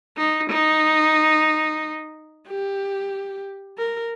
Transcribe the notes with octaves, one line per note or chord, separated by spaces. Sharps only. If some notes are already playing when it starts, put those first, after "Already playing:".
D#4
D#4
G4
A#4